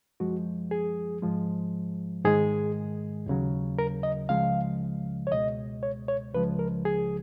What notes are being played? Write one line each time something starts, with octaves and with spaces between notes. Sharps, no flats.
F#2 F3 G#3 F#4
G#4
G#2 F3 G#3
G#2 D#3 G#3 G#4
D#2 C#3 F#3
A#4
D#5
C#2 C#3 F3 G#3 F5
C#5
C#2 B2 G#3 D#5
C#5
C#5
C#2 C#3 F3 G#3 B4
A#4
G#4